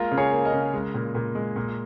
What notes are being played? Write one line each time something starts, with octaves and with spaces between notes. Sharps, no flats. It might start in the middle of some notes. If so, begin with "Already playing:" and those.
Already playing: G#3 A#3 F4 A#4
C#3
G#4 C#5
A#3
A#4 D#5
C#3
G#3
A#2
A#2
G#3
A#2